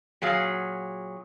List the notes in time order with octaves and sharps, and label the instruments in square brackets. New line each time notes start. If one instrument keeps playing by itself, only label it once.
[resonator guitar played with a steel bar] A#2 F#3 G#4 F5